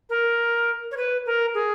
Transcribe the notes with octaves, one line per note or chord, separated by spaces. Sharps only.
A#4
C#5
B4
A#4
G#4